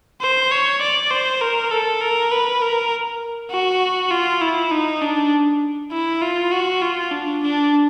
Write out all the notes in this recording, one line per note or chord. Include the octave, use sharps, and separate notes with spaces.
C5
C#5
D5
C5
A#4
A4
A#4
B4
A#4
F#4
F4
E4
D#4
D4
E4
F4
F#4
F4
D4
D4